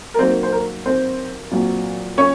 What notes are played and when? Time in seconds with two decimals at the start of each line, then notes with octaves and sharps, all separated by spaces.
0.14 A#4
0.19 D#3 F#3 A#3 C4 C5
0.43 C5
0.52 A#4
0.86 C4 C5
1.51 A#2 F#3 C4
2.18 C#4 C#5